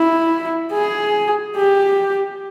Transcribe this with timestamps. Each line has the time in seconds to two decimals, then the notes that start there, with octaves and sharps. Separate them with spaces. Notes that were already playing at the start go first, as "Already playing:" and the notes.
Already playing: E4
0.73 G#4
1.56 G4